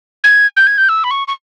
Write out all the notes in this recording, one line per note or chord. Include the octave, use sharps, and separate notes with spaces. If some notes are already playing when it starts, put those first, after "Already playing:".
G#6
G6
G#6
G6
E6
B5
C#6
C#6